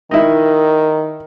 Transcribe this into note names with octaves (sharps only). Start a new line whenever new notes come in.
D#3 D#4 E4